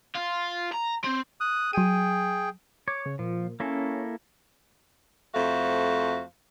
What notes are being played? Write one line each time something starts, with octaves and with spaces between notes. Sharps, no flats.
F4
A#5
C4
D#6 F#6
F#3 G#4 G5 D#7
C#5 D6
C#3
A#2 F3
A#3 C#4 E4 A4
F2 A3 F#4 C5 F5